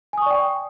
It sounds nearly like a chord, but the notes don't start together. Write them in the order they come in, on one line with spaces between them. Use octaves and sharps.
G#5 D#6 C#6 D5 G5